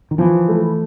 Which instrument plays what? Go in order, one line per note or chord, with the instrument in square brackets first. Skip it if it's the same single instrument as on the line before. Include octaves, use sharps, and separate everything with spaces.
[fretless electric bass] D#3
[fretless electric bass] E3 [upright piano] F3
[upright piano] A3